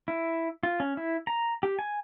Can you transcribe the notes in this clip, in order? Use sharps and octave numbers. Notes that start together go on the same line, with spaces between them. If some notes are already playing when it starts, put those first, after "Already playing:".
E4
F4
C#4
E4
A#5
G4
G#5